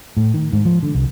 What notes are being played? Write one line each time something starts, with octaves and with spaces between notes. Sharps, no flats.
A2
D#3
G#2
F3
D3
C2